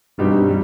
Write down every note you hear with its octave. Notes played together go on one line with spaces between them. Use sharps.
G2 B2 G3 C4 D#4 G4
G3